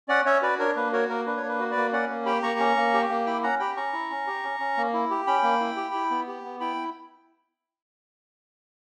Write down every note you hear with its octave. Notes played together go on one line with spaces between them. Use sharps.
C#4 D5 F#5
C#4 C#5 E5
F#4 B4 D5
D4 A#4 C#5
A#3 B4
F#4 A#4 C#5
A#3 A#4
D4 B4
C#5
A#3
B4
F#4
B4 D5
A#3
C#4 D5 F#5
A#3
G4 G5 B5
A#3 A#5 C#6
C#4
A#3
G4
A#3
E4 G5 B5
C#4 F#5 A#5
G4 G5 B5
C#4 A#5 C#6
E4
C#4
G4
C#4
C#4
A#3
E4
G4
C#4 G5 B5
A#3
E4
G4
E4
B3
G4
B3
E4 G5 B5